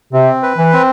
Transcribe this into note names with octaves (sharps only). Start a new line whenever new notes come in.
C3 C4
B4
E3
C4